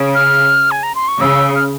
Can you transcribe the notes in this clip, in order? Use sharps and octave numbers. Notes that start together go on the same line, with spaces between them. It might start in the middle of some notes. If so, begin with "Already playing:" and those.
Already playing: C#3
F6
G#5
A#5
C6
C#6
C#3 E6
F6